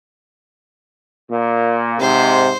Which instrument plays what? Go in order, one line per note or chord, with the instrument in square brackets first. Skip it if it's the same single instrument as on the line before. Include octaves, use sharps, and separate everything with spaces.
[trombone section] A#2
[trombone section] G#2 [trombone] C3 [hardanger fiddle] C5